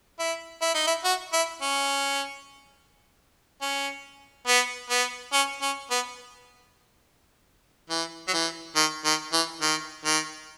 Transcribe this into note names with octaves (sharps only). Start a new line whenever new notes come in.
E4
E4
D#4
E4
F#4
E4
C#4
C#4
B3
B3
C#4
C#4
B3
E3
F#3
E3
D#3
D#3
E3
D#3
D#3